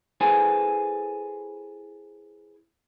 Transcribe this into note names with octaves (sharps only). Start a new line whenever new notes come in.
E4 G#4 A4 B4 C5 G#5